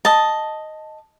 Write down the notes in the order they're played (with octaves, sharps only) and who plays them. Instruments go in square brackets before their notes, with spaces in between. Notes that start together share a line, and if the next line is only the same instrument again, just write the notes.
[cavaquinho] D#5 A5